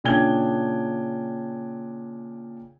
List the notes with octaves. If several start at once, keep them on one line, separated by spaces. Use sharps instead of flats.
A#2 C#3 D4 G5 G#6 G7